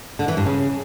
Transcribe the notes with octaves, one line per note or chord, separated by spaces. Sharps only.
D3
E3
G2
C#3